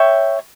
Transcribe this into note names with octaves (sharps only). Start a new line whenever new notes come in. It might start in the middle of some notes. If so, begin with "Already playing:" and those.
Already playing: C#5 E5 G5